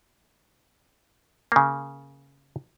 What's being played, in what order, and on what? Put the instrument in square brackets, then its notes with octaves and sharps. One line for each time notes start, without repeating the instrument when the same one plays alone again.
[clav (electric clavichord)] C#3 A#3